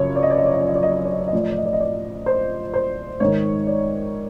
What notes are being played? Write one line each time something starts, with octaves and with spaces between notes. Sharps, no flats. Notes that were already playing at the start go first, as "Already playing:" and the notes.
Already playing: F#2 C#3 F3 C#5
D5
D#5
D5
D#5
D5
D#5
D5
D#5
D5
D#5
D5
D#5
D5
D#5
D5
D#5
A2 F3 D5
D#5
D5
D#5
D5
D#5
D5
C5
C5
G#2 D#3 C#5
D5